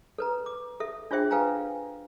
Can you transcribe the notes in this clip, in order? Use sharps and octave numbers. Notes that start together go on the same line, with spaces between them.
A4 B4 A#5
D6
A4 E5
D4 F4 G#4 C5 E5 G5
A4 B4 F5 G5 G#5 A#5